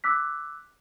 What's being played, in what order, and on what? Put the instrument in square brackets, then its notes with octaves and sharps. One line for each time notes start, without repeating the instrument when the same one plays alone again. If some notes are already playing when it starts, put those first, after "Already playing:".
[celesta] D6 E6 F#6 B6